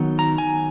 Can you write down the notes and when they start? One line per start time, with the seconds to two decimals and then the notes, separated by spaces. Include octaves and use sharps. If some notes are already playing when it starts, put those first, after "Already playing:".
Already playing: D#3 F#3 B3 D#4
0.19 A#5
0.38 G#5